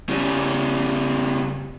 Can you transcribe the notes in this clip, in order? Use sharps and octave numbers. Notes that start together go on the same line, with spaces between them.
C#3 G3